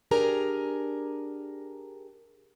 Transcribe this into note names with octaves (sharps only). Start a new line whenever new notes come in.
D4 G4 G#4 A#4 G#5 A#5